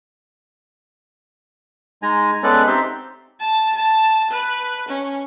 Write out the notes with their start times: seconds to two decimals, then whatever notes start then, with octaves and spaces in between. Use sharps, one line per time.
2.03 G#3 D#4 G#5 A#5
2.43 G#3 B3 C#4 A4 B4 D5
2.67 C4 D#4 G4 E5 C6
3.40 A5
3.76 A5
4.31 B4
4.89 C#4